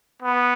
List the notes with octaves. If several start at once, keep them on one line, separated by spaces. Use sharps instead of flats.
B3